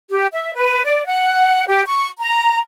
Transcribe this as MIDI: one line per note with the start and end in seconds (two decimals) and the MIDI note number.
0.10 0.26 67
0.32 0.52 76
0.55 0.82 71
0.85 1.05 74
1.05 1.65 78
1.67 1.82 67
1.86 2.08 85
2.20 2.59 82